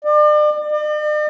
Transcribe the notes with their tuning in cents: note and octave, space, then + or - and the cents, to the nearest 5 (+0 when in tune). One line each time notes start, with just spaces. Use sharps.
D5 +35
D5 +45